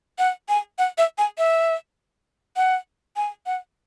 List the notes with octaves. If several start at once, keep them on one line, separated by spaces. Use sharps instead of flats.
F#5
G#5
F#5
E5
G#5
E5
F#5
G#5
F#5